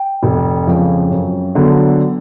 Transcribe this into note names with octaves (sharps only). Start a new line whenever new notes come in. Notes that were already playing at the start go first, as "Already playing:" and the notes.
Already playing: G5
F1
F2 C#3 F3 G#3
F#2
D3 F#3 B3 D4